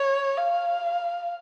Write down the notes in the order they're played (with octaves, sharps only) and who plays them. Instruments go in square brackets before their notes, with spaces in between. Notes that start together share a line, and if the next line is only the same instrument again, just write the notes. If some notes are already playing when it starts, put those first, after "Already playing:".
Already playing: [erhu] C#5
F5